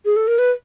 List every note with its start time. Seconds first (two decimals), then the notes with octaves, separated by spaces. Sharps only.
0.05 G#4
0.16 A4
0.28 A#4
0.39 B4